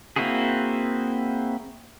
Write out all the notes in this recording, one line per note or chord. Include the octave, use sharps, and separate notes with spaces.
A#3 C4 E4 F#4 G#4